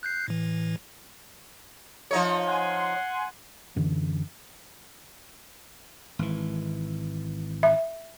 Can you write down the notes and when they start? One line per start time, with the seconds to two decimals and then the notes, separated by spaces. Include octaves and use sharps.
0.03 F#6 G6 C7
0.28 A2 E3
2.11 F3 D#4 C#5
2.46 F#5 G#5 C6
3.76 F#2 D3 E3
6.19 G#1 E3
7.63 E5